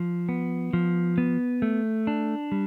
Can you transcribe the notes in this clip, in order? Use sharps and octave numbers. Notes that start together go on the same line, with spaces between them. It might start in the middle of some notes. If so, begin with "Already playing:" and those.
Already playing: F3
B3
F3
B3
A3
D4
G3